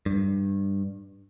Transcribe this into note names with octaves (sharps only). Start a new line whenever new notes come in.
G2